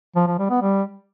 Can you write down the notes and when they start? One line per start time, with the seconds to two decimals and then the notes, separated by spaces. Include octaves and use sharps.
0.16 F3
0.27 F3
0.39 G3
0.50 B3
0.62 G3